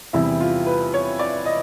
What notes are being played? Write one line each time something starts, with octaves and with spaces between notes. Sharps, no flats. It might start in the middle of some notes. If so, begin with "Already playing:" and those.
E2 C3 E3 G3 E4
F4
B4
C#5
D5
D#5